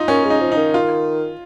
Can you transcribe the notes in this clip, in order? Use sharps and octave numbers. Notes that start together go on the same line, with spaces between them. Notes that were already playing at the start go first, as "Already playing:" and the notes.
Already playing: D#4 F4
A#3 C#4
G#3
D#4
F3
D#4
D#3
F4